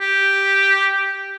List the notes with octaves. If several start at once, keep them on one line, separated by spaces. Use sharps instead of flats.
G4